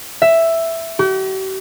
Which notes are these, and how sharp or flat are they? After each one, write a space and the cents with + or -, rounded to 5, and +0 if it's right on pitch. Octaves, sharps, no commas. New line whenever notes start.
E5 +5
G4 -45